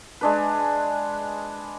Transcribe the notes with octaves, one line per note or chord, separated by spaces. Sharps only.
G#3 D4 B4